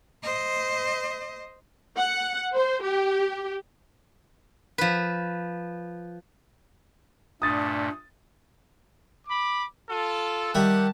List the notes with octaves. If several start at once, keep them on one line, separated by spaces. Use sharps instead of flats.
C5 D#5
F#5
C5
G4
F3 B4
G2 A#2 A3 D4 D#6 A6
B5 D6
F4 A4
D#3 G3 G4 E5 F#5 A5